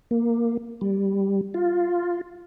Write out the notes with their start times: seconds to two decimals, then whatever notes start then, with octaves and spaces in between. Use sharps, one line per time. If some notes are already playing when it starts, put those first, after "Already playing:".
0.11 A#3
0.81 G3
1.54 F4